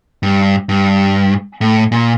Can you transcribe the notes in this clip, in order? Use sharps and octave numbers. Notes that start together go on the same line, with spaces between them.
G2
G2
A2
A#2